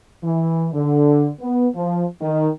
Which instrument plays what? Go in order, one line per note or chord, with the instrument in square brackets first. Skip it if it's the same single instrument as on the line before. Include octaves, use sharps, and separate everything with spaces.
[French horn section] E3
D3
B3
F3
D#3